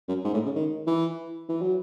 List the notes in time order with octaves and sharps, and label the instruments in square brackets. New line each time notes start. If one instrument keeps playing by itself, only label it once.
[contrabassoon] F#2
G#2
A2
C#3
D#3
E3
E3
F#3